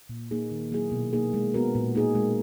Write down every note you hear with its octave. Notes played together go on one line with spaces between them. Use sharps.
A#2
A#3 D#4 G#4
D#3
F#3 A#3 E4 G#4
B2
A#3 D#4 G#4
G#3
B3 F#4 A#4
A#2
A#3 D#4 G#4
G#3